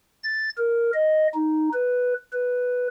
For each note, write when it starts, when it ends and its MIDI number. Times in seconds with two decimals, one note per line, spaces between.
0.24 0.50 93
0.58 0.91 70
0.94 1.27 75
1.34 1.69 63
1.74 2.14 71
2.33 2.88 71